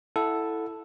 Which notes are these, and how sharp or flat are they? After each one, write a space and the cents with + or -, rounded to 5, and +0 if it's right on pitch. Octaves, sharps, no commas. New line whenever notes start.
E4 +0 A4 +0 F#5 -15